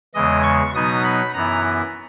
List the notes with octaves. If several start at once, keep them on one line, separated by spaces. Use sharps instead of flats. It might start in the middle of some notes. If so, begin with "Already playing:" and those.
E2 C#3 E3 G#3 D#5
C#6
B2 F#3 B3 D#4 D#6
B5
F#2 E3 B3 E4 A#5